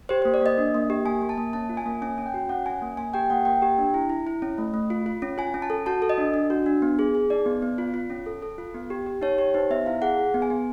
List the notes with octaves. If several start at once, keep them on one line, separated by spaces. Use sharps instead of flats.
G4 C5
C5
A#3
D5
A#3 D#5
D4
A#3
G4
A#3 G#5
A#3
A5
A#3
C#4 A5
F4
G#5
A#3
C#4 G#5
C#4
G5
F#4
C#4 F#5
C#4 G#5
A#3
A#3 G#5
G4 G5
A#3 F#5
A#3 G5
G4
D4
E4
E4
E4
C#4
A3
A3
F4
F4
C#4
F4 G#5
C#4
A5
A4
F#4 A5
A4
D#5
D4
D4
F#4
D4
B3
G#4
G#4
D#4 D5
B3
B3
F4
F4
C#4
A4
A4
F4
B3
G4
G4
D#4 C#5
G4 C#5
D#4 C5
B3 E5
E4 F5
G#4 F#5
G#4
B3
G#5
B3